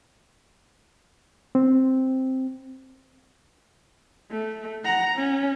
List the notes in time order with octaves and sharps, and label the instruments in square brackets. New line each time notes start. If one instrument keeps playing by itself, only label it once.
[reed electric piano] C4
[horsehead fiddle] A3
F#5 A#5
C#4